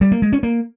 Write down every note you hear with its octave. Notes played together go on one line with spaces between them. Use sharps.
G3
A#3
G#3
C#4
A#3